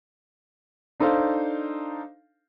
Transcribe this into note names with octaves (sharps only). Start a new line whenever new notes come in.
D4 D#4 A4 C5 F5